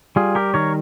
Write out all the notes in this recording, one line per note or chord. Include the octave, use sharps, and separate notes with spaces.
G3 F4 G#4
G4 A#4
D#3 A#4 C#5